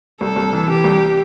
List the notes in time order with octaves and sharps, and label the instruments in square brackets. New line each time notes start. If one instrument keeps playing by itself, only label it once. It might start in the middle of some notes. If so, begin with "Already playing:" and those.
[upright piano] C2 [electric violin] A4
[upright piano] C2
E3
[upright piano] E3 [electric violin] G4
[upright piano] C2